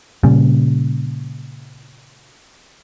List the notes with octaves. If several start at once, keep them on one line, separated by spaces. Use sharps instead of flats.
A#2 C#3 G3